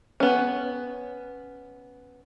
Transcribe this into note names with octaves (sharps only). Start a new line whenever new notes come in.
B3 C#4